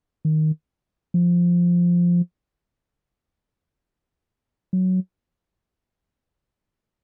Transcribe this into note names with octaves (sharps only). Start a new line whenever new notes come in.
D#3
F3
F#3